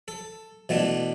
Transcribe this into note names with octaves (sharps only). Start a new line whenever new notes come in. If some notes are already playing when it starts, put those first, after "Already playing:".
A4
B2 E3 A3 D4